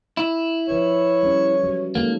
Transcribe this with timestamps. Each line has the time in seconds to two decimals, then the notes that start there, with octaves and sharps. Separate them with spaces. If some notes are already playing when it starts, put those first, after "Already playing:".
0.17 E4
0.68 F3 B4 C#5 E5
1.23 G3 C#4
1.64 F#3
1.95 D#3 G#3 A#3 A4